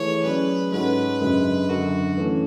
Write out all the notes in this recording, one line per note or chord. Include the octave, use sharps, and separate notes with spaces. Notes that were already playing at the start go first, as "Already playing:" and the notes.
Already playing: E3 A3 G#4 C#5
F#3 C#4 G#4 B4 D5
G#2 G#3 C#4 F#4 A4 B4
F#2 C#3 G#3 D4
F#2 D3 F#3 F#4
E3 A3 C#4